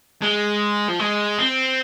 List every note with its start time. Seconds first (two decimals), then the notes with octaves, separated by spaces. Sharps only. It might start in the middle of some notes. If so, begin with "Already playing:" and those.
0.22 G#3
0.89 F3
1.00 G#3
1.39 C4